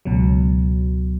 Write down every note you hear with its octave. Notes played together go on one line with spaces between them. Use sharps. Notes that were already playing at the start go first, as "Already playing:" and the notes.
C#2 B2 F#3